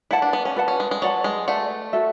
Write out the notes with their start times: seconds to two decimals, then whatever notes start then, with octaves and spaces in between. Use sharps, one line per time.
0.11 E4 B4 D5 F#5 A5
0.22 D4
0.33 B3
0.45 C#4
0.56 B4 D5 F#5 A5
0.68 C#4
0.80 G#3
0.91 G#3
1.02 F#3 B4 D5 F#5 A5
1.24 G#3
1.48 A3 B4 D5 F#5 A5
1.93 F#4 A4 E5